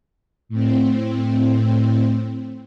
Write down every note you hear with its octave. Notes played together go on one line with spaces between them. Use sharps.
A2 C4